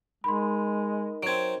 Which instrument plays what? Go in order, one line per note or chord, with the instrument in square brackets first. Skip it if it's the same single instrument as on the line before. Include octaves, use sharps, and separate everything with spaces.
[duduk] G#3 [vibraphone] D#4 A#4 D#5 [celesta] B5 C6
[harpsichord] F#3 C4 [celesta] G#6 D7